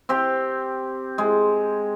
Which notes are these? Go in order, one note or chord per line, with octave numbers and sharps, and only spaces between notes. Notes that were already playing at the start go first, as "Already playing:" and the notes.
C4 G4
G#3